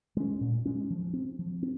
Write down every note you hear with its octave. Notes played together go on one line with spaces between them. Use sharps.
G#3 C#4
A#2
G#3 C#4
F3
C4
F3
C4